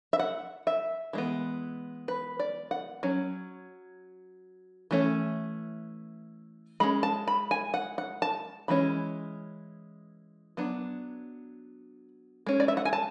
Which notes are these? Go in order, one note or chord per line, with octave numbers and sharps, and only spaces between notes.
E5
F#5
E5
E3 G#3 B3
B4
D5
F#5
F#3 C#4
E3 A3 C#4
G#3 C#4 B5
A5
B5
G#5
F#5
F#5
A5
E3 G#3 C#4 B5
F#3 B3 D4
G#3 C#4
D5
E5
F#5
G#5
A5